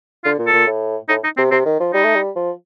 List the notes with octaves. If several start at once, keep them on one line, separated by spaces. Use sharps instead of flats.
D3 F4
A#2
A4
A#2
A2
A2 D#4
D#4
C3 C4
C3 C4
D#3
F3
G3 D#4
A3
G3
F3